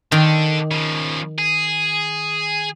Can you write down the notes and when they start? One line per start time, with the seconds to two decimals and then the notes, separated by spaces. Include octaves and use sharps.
0.12 D3 D#3 D4
0.71 C#3 F3
1.39 G#4